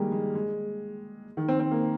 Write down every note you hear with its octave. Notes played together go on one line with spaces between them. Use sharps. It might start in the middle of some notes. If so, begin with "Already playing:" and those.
Already playing: D#3 G3 G#3 A#3
G#3
G#3
D#3
C4
C4
A#3